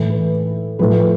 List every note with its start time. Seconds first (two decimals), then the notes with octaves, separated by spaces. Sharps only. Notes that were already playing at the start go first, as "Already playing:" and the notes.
Already playing: A2 E3
0.10 B4
0.79 A2 F3 B4